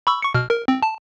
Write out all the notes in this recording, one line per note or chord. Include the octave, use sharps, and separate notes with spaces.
B5 C#6 E6
C#6 C#7
B2 F6
A#4
C4
A5